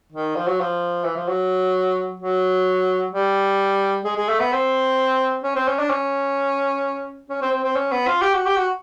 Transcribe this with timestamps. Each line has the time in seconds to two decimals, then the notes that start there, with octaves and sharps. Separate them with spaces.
0.12 D#3
0.36 F3
0.48 F#3
0.60 F3
1.04 E3
1.16 F3
1.28 F#3
2.20 F#3
3.13 G3
4.05 G#3
4.17 G#3
4.29 A3
4.40 B3
4.52 C4
5.44 C#4
5.56 C4
5.68 C#4
5.79 D4
5.90 C#4
7.29 C#4
7.42 C4
7.52 C4
7.64 C4
7.76 C#4
7.92 B3
8.07 F4
8.22 G4
8.34 F#4
8.46 G4
8.57 F#4